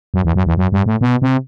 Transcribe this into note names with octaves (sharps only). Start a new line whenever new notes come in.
F#2
E2
F#2
E2
F#2
G2
A2
B2
C3